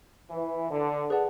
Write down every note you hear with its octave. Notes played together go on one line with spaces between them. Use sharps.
E3
D3
G#4 B4 D5 F#5 A5